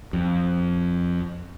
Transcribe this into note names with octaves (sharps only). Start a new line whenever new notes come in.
F2